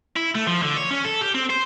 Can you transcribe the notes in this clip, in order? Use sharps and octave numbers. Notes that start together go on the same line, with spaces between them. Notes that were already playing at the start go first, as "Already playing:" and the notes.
E4
A3
F3
D3
C#5
C#4
A4
G4
C4
C5